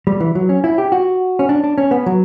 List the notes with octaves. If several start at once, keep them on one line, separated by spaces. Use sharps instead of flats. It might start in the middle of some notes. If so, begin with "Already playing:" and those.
G3
E3
F#3
C#4
E4
G4
F#4
C#4
D4
D4
C#4
B3
F#3